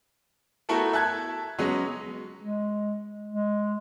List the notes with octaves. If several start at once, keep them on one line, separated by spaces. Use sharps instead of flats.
A3 B3 E4 F#4 A4 A#4
E5 A5 F#6 G#6
F#3 G#3 B3 C#4
G#3
G#3